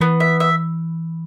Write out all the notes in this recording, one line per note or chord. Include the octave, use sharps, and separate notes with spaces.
E3 B3
E5
E5